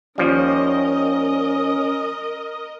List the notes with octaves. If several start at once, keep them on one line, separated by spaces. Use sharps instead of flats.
D#2 F3 G3 C#4 A#4 D#5